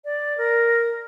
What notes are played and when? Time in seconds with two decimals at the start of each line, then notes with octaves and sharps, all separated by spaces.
0.05 D5
0.38 A#4